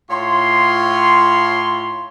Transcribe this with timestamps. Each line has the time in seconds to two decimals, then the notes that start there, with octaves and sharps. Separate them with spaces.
0.10 A2 F4 C#5 C6